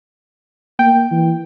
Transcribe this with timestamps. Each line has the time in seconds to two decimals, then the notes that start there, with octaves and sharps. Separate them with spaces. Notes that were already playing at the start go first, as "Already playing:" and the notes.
0.79 A#3 G5
1.11 E3